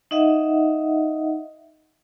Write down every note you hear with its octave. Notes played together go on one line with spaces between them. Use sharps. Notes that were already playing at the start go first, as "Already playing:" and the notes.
D#4 D#5 E5 F#5